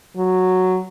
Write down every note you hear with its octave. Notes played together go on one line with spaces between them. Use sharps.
F#3